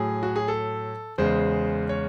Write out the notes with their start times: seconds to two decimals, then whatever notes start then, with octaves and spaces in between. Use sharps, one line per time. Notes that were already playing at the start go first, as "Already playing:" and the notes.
Already playing: A2 F#3 G#4
0.23 F#4
0.36 G#4
0.48 A4
1.18 E2 C#3 G#3 C5
1.89 C#5